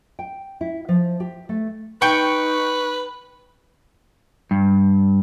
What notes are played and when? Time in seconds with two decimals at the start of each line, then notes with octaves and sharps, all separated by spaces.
0.19 G5
0.61 E4
0.89 F3
1.20 G4
1.49 A3
2.02 D#4 B4 G5 C#6
4.51 G2